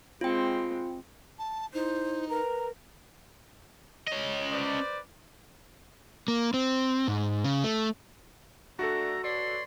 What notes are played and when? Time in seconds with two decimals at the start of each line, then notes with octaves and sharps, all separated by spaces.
0.21 G#3 C4 F4 G5
1.39 A5
1.74 D#4 E4 C5
2.29 A#4 B4 A#5
4.08 C#4 D#5
4.51 B4 C5 D5
6.28 A#3
6.54 C4
7.08 G#2
7.44 C#3
7.64 A3
8.79 A3 D4 F#4 A4 A#5
9.24 B4 C#5 D5 C6